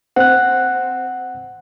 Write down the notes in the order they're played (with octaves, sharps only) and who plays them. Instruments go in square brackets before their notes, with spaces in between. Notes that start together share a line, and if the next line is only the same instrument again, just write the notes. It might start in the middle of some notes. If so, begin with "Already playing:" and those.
[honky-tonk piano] C4 [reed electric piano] F#5 F#6